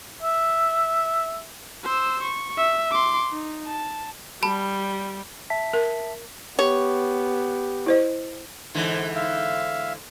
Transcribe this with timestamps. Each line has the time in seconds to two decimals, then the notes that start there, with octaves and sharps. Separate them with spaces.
0.22 E5
1.84 C5 E6
2.23 C#6
2.57 E5
2.92 C6 D6
3.31 D#4
3.67 A5
4.43 G3 A5 B5
5.50 E5 A5 B6
5.73 A#4
6.59 B3 G4 C#5
7.86 E4 C5 D#5
8.74 G#2 D3 E3
9.15 E5 F5